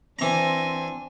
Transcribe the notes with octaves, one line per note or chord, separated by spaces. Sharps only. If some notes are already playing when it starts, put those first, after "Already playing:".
E3 C4 D4 G#5 A#5